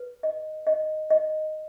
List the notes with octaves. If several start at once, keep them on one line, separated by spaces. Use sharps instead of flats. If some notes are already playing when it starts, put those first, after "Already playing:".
Already playing: B4
D#5
D#5
D#5